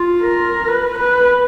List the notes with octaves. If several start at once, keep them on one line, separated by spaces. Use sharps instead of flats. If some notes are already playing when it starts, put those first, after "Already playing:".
Already playing: F4
A#4
B4
B4